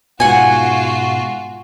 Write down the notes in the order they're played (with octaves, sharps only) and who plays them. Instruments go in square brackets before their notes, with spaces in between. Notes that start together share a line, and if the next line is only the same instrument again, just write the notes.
[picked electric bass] G#2 B2 [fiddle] F4 F#4 [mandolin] F#5 G#5